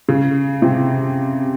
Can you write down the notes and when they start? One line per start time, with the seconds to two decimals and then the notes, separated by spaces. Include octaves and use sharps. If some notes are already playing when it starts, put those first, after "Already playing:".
0.09 C#3
0.62 C3